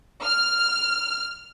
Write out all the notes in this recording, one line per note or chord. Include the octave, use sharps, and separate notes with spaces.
F6